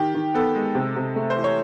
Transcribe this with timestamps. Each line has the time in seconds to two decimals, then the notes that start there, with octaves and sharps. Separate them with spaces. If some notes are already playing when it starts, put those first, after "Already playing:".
Already playing: D#3 G4
0.15 D#3
0.34 B3 A4
0.55 G#3
0.75 C3
0.96 C3
1.16 A3
1.30 C5
1.36 E3
1.44 C#5